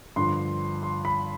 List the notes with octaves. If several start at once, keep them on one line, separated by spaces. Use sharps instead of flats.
G2 D3 F3 C6
C6
B5